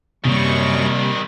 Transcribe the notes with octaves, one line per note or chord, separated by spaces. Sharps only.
F#2 C3 D#3 G3 A#3 C4 C#5 C#6